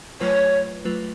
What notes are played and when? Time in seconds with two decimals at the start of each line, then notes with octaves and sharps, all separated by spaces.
0.21 F#3 A3 F4 B4 C#5
0.85 F#3 A3 F4 B4